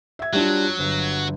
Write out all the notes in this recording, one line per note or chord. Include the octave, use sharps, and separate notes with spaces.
E5 G#6
F#3 G3 D4 F4
G1